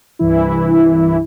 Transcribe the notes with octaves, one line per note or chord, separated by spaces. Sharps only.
C2 G2 E3 E4